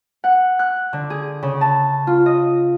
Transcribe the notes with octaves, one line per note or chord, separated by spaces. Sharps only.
F#5
F#6
D3
G#4
C#3
A5
F4
D#5